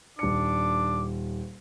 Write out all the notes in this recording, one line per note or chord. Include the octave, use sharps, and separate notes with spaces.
D#1 D4 D6 C#7